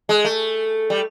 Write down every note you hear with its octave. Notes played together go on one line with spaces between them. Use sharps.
G#3
A3
G3